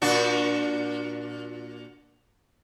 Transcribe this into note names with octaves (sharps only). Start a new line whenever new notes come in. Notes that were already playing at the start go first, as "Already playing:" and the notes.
A#2 D4 F#4